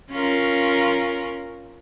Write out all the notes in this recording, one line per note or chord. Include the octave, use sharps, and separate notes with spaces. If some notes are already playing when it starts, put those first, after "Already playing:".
C#4 F4 A#4